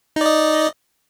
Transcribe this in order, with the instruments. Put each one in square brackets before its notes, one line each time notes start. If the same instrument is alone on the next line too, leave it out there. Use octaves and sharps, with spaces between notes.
[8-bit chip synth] D#4
D5
D#5